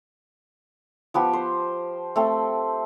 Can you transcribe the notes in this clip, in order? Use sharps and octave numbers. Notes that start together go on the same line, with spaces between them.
F3 B3 G4
C5
A3 C4